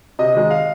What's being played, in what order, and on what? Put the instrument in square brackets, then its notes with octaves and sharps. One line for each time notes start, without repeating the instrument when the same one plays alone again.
[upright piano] C3 [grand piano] D#5
[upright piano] D#3 G#3 D#4
[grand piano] F5